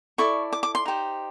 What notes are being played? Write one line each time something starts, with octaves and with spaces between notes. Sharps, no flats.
E4 A4 D5 C#6
D6
D6
C6
D#4 G4 C5